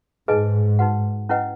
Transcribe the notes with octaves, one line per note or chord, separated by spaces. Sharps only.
G#2 D#4 G#4 B4 D#5 G#5
D#4 F#4 B4 F#5
C#4 E4 B4 D#5 F#5